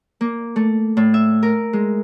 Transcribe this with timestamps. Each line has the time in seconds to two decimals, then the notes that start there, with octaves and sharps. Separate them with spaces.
0.21 A#3
0.56 A3
0.97 A2
1.14 E5
1.43 A#4
1.73 G#3